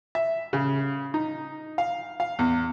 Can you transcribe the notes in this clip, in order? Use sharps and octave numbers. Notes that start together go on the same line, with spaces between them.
E5
C#3
D#4
F5
F5
E2